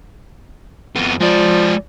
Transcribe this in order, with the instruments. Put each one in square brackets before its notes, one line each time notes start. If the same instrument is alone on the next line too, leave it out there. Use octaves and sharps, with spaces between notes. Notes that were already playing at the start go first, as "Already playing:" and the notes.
[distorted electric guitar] F2 B3
[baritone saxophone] F3 [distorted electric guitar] G#3 D5